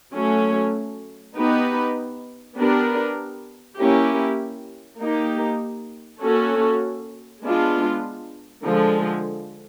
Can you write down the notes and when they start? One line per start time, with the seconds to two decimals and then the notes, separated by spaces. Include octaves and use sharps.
0.13 F#3 A3 C#4
1.36 B3 D#4 G4 B4
2.57 B3 D4 G4 A#4
3.78 A#3 C#4 E4 G4
4.99 A#3 D#4 G4
6.21 A#3 C#4 F#4 A4
7.42 G#3 B3 D4 F4
8.63 D3 F3 G#3